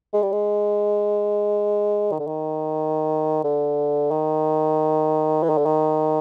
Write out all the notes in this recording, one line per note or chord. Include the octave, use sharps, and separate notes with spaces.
G#3
G3
G#3
D#3
D3
D#3
D3
D#3
E3
D#3
D3
D#3